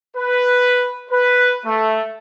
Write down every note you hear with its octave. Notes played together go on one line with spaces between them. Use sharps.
B4
B4
A3